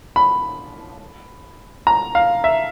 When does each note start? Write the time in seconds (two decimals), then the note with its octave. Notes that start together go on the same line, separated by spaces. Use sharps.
0.16 B5
1.87 A#5
2.15 F5
2.44 E5